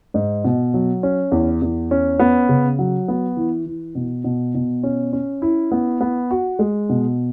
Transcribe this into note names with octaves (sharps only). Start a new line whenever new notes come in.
G#2
B2
F#3
C#4
E2
E2
C#4
B3
C#3
F#3
B3
E3
E3
B2
B2
B2
C#4
C#4
E4
B3
B3
F#4
G#3
B2